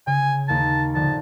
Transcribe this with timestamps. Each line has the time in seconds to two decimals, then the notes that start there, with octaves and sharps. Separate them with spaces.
0.07 C#3 G#5
0.48 D#2 A#3 A5 G#6
0.94 A#1 D3 A5 G6